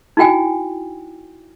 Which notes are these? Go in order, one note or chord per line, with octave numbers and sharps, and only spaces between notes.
D#4 E4 F#4 G5 G#5